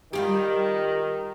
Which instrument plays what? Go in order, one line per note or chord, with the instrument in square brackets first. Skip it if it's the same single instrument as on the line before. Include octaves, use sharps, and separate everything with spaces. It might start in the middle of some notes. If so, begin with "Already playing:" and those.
[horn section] D#3 [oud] G3 F4 G4